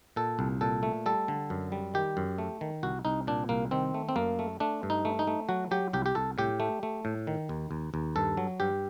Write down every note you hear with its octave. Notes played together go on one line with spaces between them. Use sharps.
A#2 A4
C2
A#2 A4
A3
G3 A4
D3
F#2
G3
D#3 G4
F#2
A3
D#3
C2 F#4
C2 D#4
A#2 D4
C2 A#3
D#3 C4
A3
C4
F#2 A#3
A3
A3 D4
G2
D#4
A3
D#4
A3
F#3 F#4
F#3 G4
C2 G4
G4
C2 A4
A2 G4
A3
A3
A2
D#3
D#2
D#2
D#2
G2 A4
F#3
G2 G4